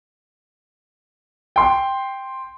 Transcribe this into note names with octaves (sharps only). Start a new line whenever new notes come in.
G5 C6